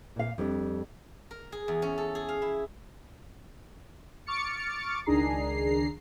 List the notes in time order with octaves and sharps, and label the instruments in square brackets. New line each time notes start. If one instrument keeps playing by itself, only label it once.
[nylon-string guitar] A#2 F5
F2 G3 D4
[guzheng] A#4
G#4
E2
C#4
A4
G#4
F5
E4
[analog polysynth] C#6 D6 F6 A6 C#7
C#2 D#3 D4 G#4 A#5 C7